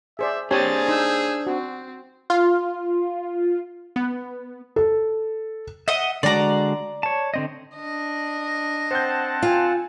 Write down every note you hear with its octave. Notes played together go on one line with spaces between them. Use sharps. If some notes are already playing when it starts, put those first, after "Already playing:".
G#4 C5 D5 E5
C4 D4 G4 G#4 C5 C#5 G#5 A6
D#4 E6 G6
C4 F#4
F4
B3
A4
D#5 E5 F#5
D3 G#3 F#4 D5 A#5
C#5 A5
D3 C4 D#5
D4 D#5
C4 C5 F#5 A5 G6
F4 G5 G#5